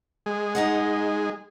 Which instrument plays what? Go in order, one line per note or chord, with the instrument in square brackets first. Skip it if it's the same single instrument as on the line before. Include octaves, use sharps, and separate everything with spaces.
[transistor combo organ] G#3
[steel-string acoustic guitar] D#4 D#5 F#5